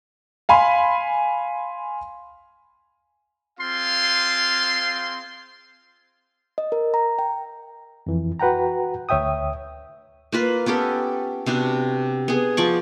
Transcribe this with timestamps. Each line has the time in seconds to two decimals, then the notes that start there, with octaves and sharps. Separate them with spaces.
0.49 F5 G#5 B5 C6
3.60 C4 F4 G#4 F5 C6
6.58 D#5
6.72 A#4
6.94 A#5
7.19 G5
8.07 F2 E3
8.40 F#4 B4 F#5 G5 A#5
9.09 D2 C#5 E5 G5 D#6
10.32 A#3 F4 B4
10.66 B3 C#4 G4 A4
11.46 C3 B3 D4 F#4
12.28 B3 G#4
12.57 F3 D5 C#6